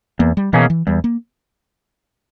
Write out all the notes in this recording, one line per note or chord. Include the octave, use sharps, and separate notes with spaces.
E2 A#3
G3
B2 E3 A#3 C#4 G#4
E3
E2 G3
A#3